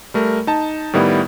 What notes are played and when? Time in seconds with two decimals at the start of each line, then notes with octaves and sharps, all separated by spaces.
0.14 G3 A3 A#4
0.47 D#4 A5
0.93 A2 D#3 G3 B3 E4